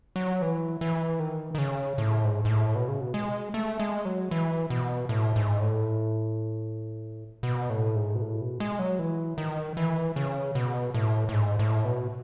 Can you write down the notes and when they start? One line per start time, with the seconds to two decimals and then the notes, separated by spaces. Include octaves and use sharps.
0.16 F#3
0.42 E3
0.81 E3
1.19 D#3
1.55 D#3
1.58 C#3
1.98 A2
2.24 G#2
2.45 G#2
2.49 A2
2.75 B2
2.88 C#3
3.01 B2
3.14 G#3
3.54 A3
3.80 G#3
4.05 F#3
4.31 E3
4.70 B2
5.09 A2
5.36 G#2
5.61 A2
7.43 B2
7.70 A2
7.95 G#2
8.15 B2
8.21 A2
8.41 B2
8.60 G#3
8.79 F#3
8.99 E3
9.38 D#3
9.77 E3
10.16 C#3
10.55 B2
10.94 A2
11.29 A2
11.33 G#2
11.59 A2
11.84 B2